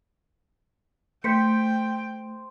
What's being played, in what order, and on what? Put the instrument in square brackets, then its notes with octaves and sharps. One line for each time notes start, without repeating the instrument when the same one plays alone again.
[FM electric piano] A3 [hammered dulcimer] C5 [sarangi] G5 [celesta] G6 B6 C#7